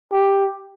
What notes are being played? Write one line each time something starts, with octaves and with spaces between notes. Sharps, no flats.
G4